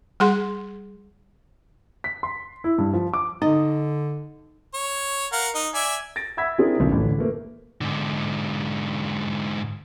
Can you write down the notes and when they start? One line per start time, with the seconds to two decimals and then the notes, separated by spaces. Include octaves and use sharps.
0.20 G3 G#4 F#5 C6
2.04 B6
2.23 C6
2.64 E4
2.78 G2
2.93 F3
3.14 D6
3.42 D3 D#4 D#5
4.74 C#5
5.32 A#4 F5 F#5
5.55 D#4
5.74 D5 E5 G#5
6.16 A6 A#6 D7
6.37 E5 F#5 B5 E6 G#6 B6
6.58 C4 D4 E4 G#4 A#4
6.76 B1 C#3
6.92 A1 F2 D3
7.18 A3 A#3 B4
7.81 G#2 D3